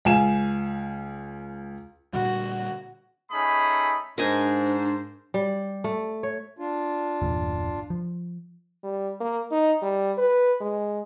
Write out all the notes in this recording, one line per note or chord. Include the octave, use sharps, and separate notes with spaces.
C#2 F5 G#5 E7
A#2 D3 G3 F#4
A3 C#4 D#4 G#4 B5 D#6
G#2 D4 A#4 C5 D#5 G#5
G3
A3
C#5
D4 F4
G1 E2 A#2
F3
G3
A#3
D#4
G3
B4
G#3